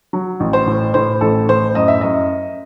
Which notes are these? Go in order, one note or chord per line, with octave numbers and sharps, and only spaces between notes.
F#3
A1
C5
A2
A2 C5
A1 A4
A2 C5
F#2 D#5
E5
F#2 D#5